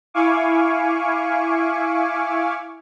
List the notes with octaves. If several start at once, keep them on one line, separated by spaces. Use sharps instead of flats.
E4 F5 G#5 C#6 D6